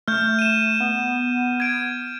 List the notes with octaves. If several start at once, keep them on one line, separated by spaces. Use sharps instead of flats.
A3 F6 G6
D#7 E7
B3
G#6 D7